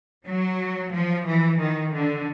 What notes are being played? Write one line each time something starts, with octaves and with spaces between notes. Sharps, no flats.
F#3
F3
E3
D#3
D3